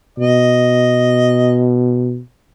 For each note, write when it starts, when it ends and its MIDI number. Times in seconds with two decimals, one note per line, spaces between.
0.19 2.21 47
0.19 1.64 75